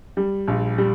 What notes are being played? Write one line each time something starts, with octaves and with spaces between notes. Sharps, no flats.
G3
A#1
G3